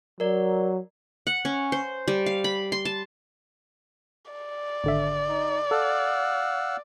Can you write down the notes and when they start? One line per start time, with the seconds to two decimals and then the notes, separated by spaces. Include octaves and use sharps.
0.20 F#3 A#4 D5
1.27 F#5
1.45 C#4
1.72 C5
2.08 G3
2.26 F5
2.44 B5
2.72 C6
2.85 A5
4.31 D5
4.84 G#1 D3 E5
5.29 D#4
5.71 A4 F5 F#5 E6